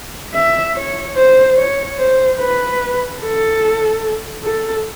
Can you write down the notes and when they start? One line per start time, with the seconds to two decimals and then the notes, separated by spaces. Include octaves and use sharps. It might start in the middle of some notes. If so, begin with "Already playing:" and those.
0.34 E5
0.75 C#5
1.16 C5
1.57 C#5
1.98 C5
2.39 B4
3.21 A4
4.44 A4